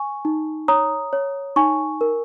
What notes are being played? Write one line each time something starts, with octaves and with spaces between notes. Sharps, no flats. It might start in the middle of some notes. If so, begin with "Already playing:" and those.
Already playing: G#5 C#6
D#4
C#5 A#5 D#6
C#5
D#4 G#5 C#6
A#4